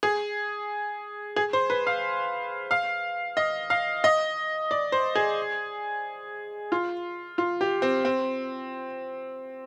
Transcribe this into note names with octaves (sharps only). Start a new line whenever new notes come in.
G#4
G#4
C5
B4
F5
F5
D#5
F5
D#5
D5
C5
G#4
F4
F4
G4
C4
C4